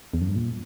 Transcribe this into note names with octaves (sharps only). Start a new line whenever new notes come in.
E2
F#2
G2
A#2